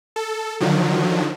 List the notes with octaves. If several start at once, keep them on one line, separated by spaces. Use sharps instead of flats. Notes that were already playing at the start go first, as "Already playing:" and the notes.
A4
D3 D#3 F3 F#3